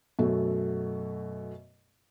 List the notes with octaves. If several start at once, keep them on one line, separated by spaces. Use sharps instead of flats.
F#2 B2 A3